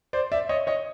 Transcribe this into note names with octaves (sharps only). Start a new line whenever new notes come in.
C5 D5
D5 E5
C#5 D#5
C#5 D#5